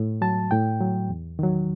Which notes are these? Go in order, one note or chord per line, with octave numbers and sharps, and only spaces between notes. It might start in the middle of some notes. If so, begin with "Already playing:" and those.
Already playing: A2
F#3 A5
A2 G5
F#3
E2
D#3 F#3